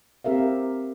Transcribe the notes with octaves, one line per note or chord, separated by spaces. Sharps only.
C4 G4 A#4 E5 F5